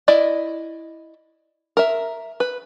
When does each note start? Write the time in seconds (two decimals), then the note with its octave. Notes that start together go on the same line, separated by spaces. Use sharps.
0.08 E4 D5 D#5
1.77 A#4 E5
2.40 B4